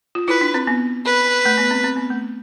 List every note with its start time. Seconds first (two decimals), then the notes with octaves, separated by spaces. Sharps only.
0.15 F4
0.28 E4 B4
0.41 D4
0.54 C4
0.67 B3
1.06 B4
1.45 A3
1.58 B3
1.71 C4
1.84 C4
1.96 B3
2.10 A3